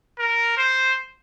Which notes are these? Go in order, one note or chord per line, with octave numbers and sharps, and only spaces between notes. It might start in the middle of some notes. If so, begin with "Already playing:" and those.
A#4
C5